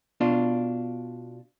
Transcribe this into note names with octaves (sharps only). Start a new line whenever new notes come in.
B2 D4 F4